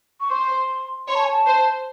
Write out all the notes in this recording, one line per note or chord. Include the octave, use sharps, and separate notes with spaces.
C#6
C5 C6
C#5 C6
A5
G#5
A5
C5